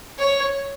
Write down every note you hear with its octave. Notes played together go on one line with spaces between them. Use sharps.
C#5